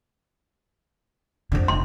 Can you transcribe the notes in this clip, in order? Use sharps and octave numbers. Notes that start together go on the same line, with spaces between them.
F2 D3
F1 C6